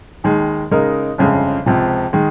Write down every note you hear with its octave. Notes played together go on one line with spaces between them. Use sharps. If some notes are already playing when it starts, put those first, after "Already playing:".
D#2 D#3 G#3
C#3 G#3 D#4 A#4
G1 F2 C#3 G#3
C#2 C3 F3
D#3 G#3